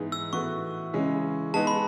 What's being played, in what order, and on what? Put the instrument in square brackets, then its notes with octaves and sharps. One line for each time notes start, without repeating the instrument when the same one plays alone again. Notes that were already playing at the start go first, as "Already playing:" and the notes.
Already playing: [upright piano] G#2 E3 B3 D#4 G#4
[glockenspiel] E6
[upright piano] A2 E3 B3 F#4 [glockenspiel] C#6
[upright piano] C#3 E3 G#3 C#4
[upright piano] G#3 B3 D#4 [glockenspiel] A5
[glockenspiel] B5